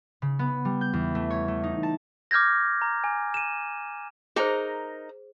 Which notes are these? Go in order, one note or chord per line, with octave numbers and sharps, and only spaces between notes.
C#3
B3
G3
G6
E2
A3
C#5
A3
D#4
A5
D6 F6 G6 G#6 A#6
A#5
G#5
D#7 E7
D#4 G#4 A#4 C5 A#5